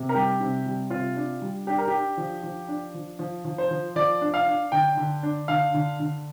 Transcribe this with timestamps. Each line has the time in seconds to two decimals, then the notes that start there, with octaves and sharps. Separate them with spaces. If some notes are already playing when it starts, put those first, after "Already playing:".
Already playing: C3
0.09 A#4
0.15 G3 G4
0.40 C3
0.66 G3
0.90 C3 F4
1.16 D4
1.42 G3
1.67 D4 G4
1.78 A#4
1.88 G4
1.93 D4
2.17 F3
2.43 F3
2.68 D4
2.94 F3
3.19 F3
3.45 F3
3.58 C5
3.71 F3
3.96 F3 D5
4.21 D4
4.34 F5
4.47 D4
4.72 D3 G5
4.97 D3
5.23 D4
5.48 D3 F5
5.74 D3
6.00 D3